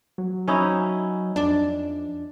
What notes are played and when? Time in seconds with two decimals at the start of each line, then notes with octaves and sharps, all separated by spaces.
0.18 F#3
0.48 C#4 D#4 E4
1.36 F2 D4